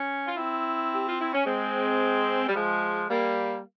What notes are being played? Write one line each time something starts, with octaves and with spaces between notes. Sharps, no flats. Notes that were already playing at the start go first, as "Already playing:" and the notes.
Already playing: C#4
F4
C4 E4
G4
F4
E4
C#4
G#3 C4
G3
F3 G#3
G3 A#3